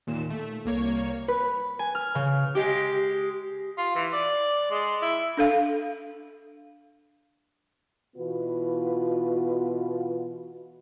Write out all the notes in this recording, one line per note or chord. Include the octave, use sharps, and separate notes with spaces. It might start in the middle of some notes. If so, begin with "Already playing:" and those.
D#2 A#2 E7
A3
C2 A#3 C#5
B4
G#5
F6
C#3
G#3 G4
F4
E3
D5
G#3
E4
D4 A4 F5
B2 E3 B3 F4 F#4 B4